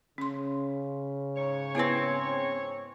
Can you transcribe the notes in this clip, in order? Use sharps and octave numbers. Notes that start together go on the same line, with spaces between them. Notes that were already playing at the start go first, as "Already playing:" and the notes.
C#3 C#4 C6
G#2 C#5
B3 C4 E4 G#4 B4